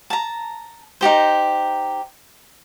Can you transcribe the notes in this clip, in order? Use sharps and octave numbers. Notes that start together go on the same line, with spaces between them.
A5 A#5
D#4 F#4 G4 C5